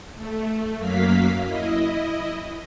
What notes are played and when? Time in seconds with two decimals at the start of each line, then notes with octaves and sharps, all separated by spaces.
0.15 A3
0.78 F#2 F#3 A#3 F5 B6
1.44 E4 D#5